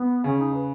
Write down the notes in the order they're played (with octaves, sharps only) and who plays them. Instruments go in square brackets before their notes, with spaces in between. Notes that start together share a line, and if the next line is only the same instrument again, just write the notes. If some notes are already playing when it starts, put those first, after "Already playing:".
Already playing: [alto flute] B3
[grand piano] C#3 [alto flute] C#4
[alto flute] D#4
B4